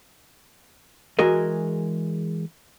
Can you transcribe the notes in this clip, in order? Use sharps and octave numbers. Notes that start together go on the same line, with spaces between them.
E3 G#3 F#4 G#4 A#4 D#5